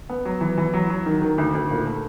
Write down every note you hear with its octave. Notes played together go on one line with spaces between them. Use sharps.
B3
F#3
E3
E3
F#3
F#3
D#3
D#3
D2
D2
A#2
A3